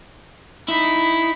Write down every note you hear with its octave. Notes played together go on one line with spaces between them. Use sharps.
D#4 E4 B6